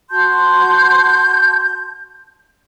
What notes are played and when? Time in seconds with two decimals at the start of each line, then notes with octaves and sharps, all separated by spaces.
0.10 F#4 A5 C6 G6